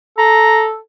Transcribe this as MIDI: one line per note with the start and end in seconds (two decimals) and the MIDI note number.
0.18 0.78 69
0.18 0.63 82